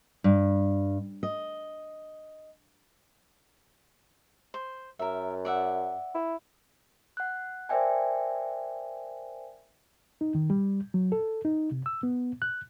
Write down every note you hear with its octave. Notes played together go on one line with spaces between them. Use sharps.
G2
D#5
C5
F#2 A#4 E5
D5 E5 F#5
E4
F#5 F#6
A#4 C5 D5 E5 G5 G#5
D#4
D#3
G3
F#3
A4
D#4
C3
E6
B3
F#6